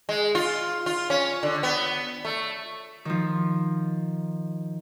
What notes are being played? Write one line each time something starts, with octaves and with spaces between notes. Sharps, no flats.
G#3
F4
F4
C#4
D3
B3
A3
D#3 F3